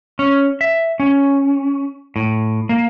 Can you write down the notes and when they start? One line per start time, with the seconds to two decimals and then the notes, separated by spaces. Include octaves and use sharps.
0.19 C#4
0.61 E5
1.00 C#4
2.16 A2
2.69 A#3